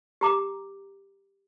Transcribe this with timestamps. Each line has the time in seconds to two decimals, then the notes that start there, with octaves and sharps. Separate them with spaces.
0.21 G4 A#5 D6